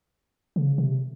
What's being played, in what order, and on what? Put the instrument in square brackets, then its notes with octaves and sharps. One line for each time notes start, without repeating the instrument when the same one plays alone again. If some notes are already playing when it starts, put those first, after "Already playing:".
[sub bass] C#3
C3